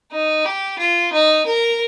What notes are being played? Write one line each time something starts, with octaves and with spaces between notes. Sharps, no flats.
D#4
G4
F4
D#4
A#4